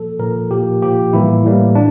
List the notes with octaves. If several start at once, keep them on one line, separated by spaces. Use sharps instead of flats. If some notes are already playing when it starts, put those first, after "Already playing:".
Already playing: A#2 F3 A#3 A4
A#2 F3 A#3 A#4
A#2 F3 A#3 G4
A#2 F3 A#3 G4
A2 E3 G3 A#3 E4
A2 E3 G3 A#3
D4